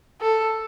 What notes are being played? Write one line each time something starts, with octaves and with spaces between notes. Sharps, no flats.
A4